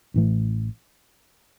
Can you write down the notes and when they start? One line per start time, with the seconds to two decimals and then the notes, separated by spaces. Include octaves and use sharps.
0.14 A1 A2 E3 A3